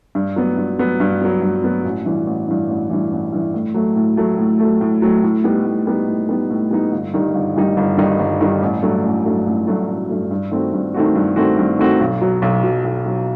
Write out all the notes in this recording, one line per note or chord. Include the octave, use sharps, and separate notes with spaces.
G2
F#3 B3
G2
F#3 B3
G2
F#3 B3
G2
F#3 B3
A1
G2 E3
A1
G2 E3
A1
G2 E3
A1
G2 E3
A2
F#3 A3
A2
F#3 A3
A2
F#3 A3
A2
F#3 A3
A2
G3 B3 D#4
A2
G3 B3 D#4
A2
G3 B3 D#4
A2
G3 B3 D#4
G1
G2 D#3 G3 D#4
G1
G2 D#3 G3 D#4
G1
G2 D#3 G3 D#4
G1
G2 D#3 G3 D#4
A1
G2 F#3 A3
A1
G2 F#3 A3
A1
G2 F#3 A3
A1
G2 F#3 A3
G2
D#3 A3 C4 F#4
G2
D#3 A3 C4 F#4
G2
D#3 A3 C4 F#4
G2
D#3 A3 C4 F#4
B1
B2 F#3
B1
B2 F#3
B1
B2 F#3